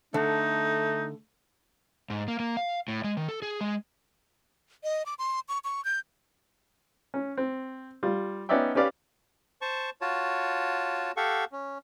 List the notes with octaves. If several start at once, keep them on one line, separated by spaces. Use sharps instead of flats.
D3 A3 D#4
G#2
A#3
A#3
F5
A2
G#3
D#3
A4
G#4
G#3
D#5
D6
C6
C#6
C#6
G6
C#4
C4
G3 F4
B3 C#4 D#4 D5 E5 G5
C#4 G4 B4 D5 F5
C5 A5 C#6
F4 F#4 C#5 A5
G4 A4 F5 F#5 C#6
C#4